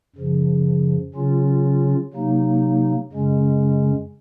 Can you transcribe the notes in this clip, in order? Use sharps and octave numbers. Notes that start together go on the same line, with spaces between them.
F#2 C#3 F3
C#3 F#3 C#4 F4
C3 F#3 A#3 D#4
F#2 C#3 G#3 C#4